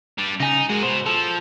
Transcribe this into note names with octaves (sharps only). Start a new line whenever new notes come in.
G3 D4
C#3 D#4 G#5
G#3 F#4 A#4
B2 C5
F3 A4